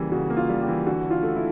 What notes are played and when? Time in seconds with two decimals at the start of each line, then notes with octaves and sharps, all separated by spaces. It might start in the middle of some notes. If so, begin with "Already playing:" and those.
Already playing: C#3 E3 G3 A#3 G4
0.12 C#3 F#4
0.30 A#3
0.37 F4
0.49 G3
0.62 G4
0.68 E3
0.85 D3 F#4
1.05 D3
1.11 F4
1.23 A3
1.36 E4